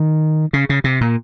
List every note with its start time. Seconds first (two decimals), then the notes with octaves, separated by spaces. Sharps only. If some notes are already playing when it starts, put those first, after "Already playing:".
Already playing: D#3
0.53 C#3
0.69 C#3
0.84 C3
1.01 A#2